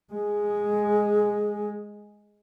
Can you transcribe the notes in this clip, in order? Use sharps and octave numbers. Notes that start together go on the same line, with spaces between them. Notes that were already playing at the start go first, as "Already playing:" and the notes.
G#3 G#4